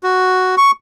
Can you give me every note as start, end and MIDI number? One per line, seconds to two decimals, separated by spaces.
0.03 0.55 66
0.57 0.71 85